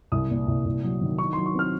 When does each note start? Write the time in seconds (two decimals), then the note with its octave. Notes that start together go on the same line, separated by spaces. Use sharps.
0.12 C2 D#6
0.30 A#2
0.48 C2
0.65 C2
0.83 F#3
1.01 D#3
1.18 D#4 C#6
1.33 F#3 C6
1.46 C#6
1.54 C4 F6